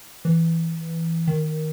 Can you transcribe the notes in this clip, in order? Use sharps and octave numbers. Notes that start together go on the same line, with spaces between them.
E3
D#3